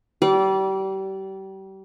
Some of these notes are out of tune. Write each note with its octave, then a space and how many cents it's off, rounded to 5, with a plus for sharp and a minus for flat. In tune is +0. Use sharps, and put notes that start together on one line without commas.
G3 -30 D5 -15